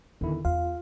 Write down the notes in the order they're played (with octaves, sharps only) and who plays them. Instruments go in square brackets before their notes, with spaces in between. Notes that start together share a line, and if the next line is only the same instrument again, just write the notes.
[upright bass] E2 [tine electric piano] D3 D#3 E4
[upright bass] E2 [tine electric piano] F4 [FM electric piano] F5